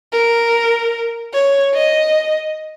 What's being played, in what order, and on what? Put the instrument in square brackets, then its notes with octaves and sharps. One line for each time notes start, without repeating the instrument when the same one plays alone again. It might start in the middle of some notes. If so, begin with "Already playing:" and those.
[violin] A#4
C#5
D#5